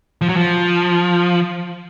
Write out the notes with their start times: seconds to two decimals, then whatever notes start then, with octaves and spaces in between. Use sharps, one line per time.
0.21 F3
0.29 F#3
0.37 F3